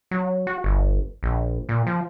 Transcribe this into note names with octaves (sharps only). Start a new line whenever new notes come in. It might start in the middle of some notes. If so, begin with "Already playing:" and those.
F#3
F#4
G1
A#1
A#2
F3